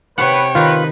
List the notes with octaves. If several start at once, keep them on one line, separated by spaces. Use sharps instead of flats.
C3 B4 C#5 F#5 G5
D#3 D#4 F4 B4